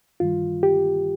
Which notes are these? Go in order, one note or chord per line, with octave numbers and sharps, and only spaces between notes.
G2 D#3 G3 F4
G4